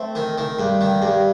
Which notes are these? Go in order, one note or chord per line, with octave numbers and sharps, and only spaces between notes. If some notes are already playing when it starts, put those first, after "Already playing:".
Already playing: A3 C4
D#3
D#3
G2
D#3
G2